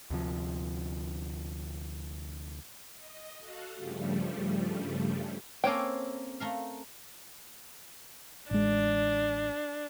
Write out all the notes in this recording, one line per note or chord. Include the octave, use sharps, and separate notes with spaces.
D2 C3 F3
D#5
F#4 A4 F5 F#5
G2 C#3 F3 G3 A3
A#3 C4 C#4 A4 C#5 G5
A3 A#4 F5
A1 G#3 D4